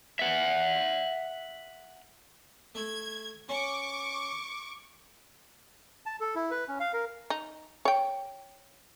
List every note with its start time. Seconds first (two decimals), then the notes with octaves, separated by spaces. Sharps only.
0.19 E5 F#5
2.75 A3 G#6
3.49 C#4 C#6 D6
6.06 A5
6.20 A4
6.35 E4
6.51 B4
6.68 C#4
6.80 F5
6.93 A#4
7.30 D#4
7.85 C#5 G5